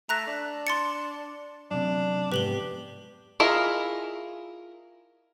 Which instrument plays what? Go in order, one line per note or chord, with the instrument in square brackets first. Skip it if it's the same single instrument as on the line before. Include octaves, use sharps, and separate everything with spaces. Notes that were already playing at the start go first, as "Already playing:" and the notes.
[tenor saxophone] A3 [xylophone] A#5 F#6 A#6
[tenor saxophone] D4
[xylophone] C6 A6 C#7
[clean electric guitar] F#2 C3 [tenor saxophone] D4
[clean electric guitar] F2 G#2 B3 [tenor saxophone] G4 [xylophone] B4 F#7 G7
[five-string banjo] E4 F4 G#4 A#4 D#5